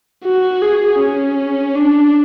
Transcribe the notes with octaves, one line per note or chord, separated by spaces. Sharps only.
F#4
G#4
C#4
D4